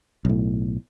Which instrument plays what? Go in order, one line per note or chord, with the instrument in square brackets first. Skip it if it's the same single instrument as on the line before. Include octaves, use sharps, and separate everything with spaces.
[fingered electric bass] B1 A2